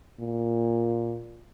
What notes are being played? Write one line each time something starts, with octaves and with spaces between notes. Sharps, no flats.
A#2